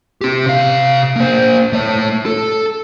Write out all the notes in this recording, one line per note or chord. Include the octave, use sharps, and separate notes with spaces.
C4 G4
C3 F5
A#3 C5
A3 C#5
A4